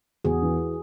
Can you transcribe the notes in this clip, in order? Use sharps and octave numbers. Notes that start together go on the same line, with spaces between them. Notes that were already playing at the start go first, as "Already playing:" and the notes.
E2 F#4 G#4
E3